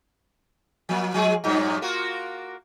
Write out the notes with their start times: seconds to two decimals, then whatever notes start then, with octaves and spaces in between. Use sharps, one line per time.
0.89 F3 A#3
1.14 F3 G#3 G#4
1.44 G2 A#2 F#3
1.82 A#3 F4 F#4